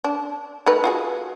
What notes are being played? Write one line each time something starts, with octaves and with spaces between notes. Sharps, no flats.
D4
A3 D#4 B4
F4 F#4 G#4